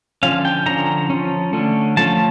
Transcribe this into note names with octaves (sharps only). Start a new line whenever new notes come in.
D3 F3 C#4 F5
G5
D3 F3 C#4 A#5
F3 C#4
D3 A3 C#4
F3 A3 C#4 A5